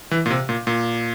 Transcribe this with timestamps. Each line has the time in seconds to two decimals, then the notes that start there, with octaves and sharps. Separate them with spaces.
0.11 E3
0.26 A#2
0.30 C3
0.49 A#2
0.67 A#2